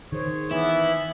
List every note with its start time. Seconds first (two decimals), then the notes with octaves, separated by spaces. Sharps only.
0.12 D#3 G#4 C5 C#5
0.51 E3 B3 E4